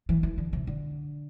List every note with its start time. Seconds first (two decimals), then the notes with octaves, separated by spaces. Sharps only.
0.09 E3
0.23 E3
0.38 D3
0.53 C3
0.67 D3